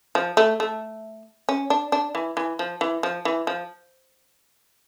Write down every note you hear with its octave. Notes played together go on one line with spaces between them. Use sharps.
F3
A3
A3
C#4
D4
D4
E3
E3
F3
E3
F3
E3
F3